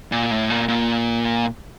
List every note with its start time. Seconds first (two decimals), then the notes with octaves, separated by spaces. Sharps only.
0.12 A#2
0.31 A2
0.50 A#2
0.68 A#2